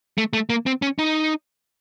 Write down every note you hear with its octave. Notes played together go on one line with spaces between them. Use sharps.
A3
A3
A#3
C4
C#4
D#4